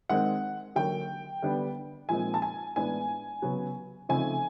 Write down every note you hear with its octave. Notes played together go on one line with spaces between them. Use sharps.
D#3 G#3 C4 D#4 F#5
D3 F#3 A#3 G5
D3 G3 B3 D4
A#2 F3 G#3 C4 D#4 G#5
A5
G#5
A2 E3 G#3 B3 D4 G#5
C#3 F#3 B3
C#3 F3 A3 C4 D#4 G#5